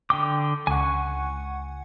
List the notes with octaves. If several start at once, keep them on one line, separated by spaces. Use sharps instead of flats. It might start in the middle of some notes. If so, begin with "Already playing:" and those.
D3 G5 D6
C#2 F#5 G#5 C#6